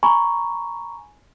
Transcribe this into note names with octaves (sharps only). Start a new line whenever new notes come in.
G#5 A#5 B5 C#6